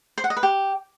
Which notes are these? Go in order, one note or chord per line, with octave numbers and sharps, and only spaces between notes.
C5
F#5
D#5
B4
G4